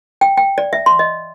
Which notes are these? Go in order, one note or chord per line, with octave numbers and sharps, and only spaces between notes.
G5
G5
D5
E5
C6
D#5